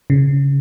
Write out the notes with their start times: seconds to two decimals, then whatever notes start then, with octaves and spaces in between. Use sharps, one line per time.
0.10 C#3